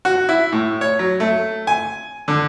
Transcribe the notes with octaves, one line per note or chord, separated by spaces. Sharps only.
F#4
E4
A2
C#5
F#3
A3
G#5
D3